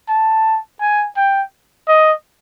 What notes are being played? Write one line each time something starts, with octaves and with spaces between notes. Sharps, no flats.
A5
G#5
G5
D#5